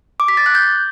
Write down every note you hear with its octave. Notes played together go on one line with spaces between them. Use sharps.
D6
B6
A6
F#6
G6